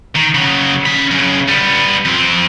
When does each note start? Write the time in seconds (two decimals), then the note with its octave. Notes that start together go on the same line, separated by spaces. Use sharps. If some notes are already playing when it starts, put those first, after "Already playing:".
0.16 D#3
0.35 C#3 F#3
0.86 C#4 B5
1.11 F#2 C#3
1.48 G3 B3
2.05 F2 C4